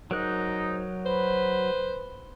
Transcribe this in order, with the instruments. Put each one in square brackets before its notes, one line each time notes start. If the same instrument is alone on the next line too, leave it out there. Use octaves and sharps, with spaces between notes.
[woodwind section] G#2 D#4 [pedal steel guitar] F#3 A#4 F#6
[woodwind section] B4 [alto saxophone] C5